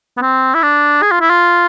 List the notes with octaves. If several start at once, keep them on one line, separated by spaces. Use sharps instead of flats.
B3
C4
E4
D4
G#4
F4
E4
F4